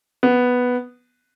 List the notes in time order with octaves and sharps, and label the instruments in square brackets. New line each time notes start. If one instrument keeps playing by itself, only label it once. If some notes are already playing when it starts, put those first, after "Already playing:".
[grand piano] B3